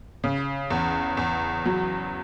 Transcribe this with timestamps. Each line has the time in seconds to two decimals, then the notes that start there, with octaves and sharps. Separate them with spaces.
0.24 C#3
0.70 E2
1.17 E2
1.66 F#3